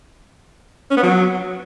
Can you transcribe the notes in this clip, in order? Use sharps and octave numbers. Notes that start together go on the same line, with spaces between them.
C#4
B3
F#3